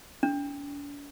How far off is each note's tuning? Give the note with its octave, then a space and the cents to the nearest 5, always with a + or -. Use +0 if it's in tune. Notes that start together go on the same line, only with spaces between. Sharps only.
D4 -45